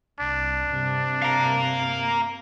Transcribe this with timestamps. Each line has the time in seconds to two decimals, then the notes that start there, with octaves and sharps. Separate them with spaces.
0.19 C2 D4
0.71 G2 C3
1.22 F5 A#5